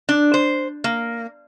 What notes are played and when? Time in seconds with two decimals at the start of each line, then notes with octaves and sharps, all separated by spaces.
0.09 D4
0.34 C5
0.84 A#3